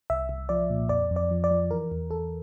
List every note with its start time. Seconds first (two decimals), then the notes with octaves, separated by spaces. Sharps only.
0.10 C2 E5
0.29 C2
0.49 F3 D5
0.70 A#2
0.89 F2 D5
1.11 F2
1.16 D5
1.31 F3
1.44 D5
1.51 F3
1.71 E3 A#4
1.92 E2
2.11 E2 A4